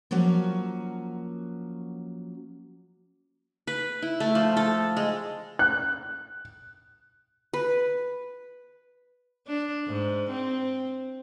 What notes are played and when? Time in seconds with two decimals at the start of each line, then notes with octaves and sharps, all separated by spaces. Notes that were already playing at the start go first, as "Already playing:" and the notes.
0.11 F3 F#3 A#3 C#4 F#4
3.67 B4
4.02 E4
4.20 A3
4.35 F3
4.57 A4
4.97 G#3
5.59 F#6
7.53 B4
9.47 D4
9.87 G#2
10.30 C4